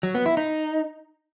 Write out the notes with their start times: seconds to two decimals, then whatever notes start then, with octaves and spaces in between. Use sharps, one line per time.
0.03 F#3
0.15 B3
0.26 E4
0.37 D#4